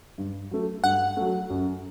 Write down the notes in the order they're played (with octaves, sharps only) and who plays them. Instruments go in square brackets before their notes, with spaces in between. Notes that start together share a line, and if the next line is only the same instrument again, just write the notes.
[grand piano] G2
F#3 A3
[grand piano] G2 [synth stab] F#5
[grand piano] F#3 A3
F#2